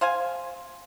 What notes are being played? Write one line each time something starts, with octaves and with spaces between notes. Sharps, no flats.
C5 F5 G#5